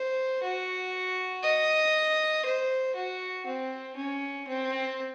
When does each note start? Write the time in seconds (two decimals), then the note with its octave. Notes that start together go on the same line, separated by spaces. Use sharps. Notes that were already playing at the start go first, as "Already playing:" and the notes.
Already playing: C5
0.43 F#4
1.44 D#5
2.46 C5
2.96 F#4
3.47 C4
3.97 C#4
4.48 C4